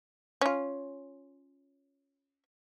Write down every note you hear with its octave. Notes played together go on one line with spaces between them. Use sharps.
C#4 F4